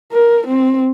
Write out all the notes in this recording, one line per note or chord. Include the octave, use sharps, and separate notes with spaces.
A#4
C4